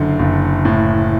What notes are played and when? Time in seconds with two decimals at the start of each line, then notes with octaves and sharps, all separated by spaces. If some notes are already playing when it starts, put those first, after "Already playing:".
Already playing: F#1 F#2 D3
0.19 F#1
0.65 A2